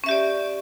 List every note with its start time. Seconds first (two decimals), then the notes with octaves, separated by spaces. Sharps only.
0.04 C#4
0.06 E5
0.09 G4
0.11 D5